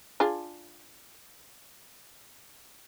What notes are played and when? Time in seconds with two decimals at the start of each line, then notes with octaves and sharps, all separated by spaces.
0.20 D4 F4 G#4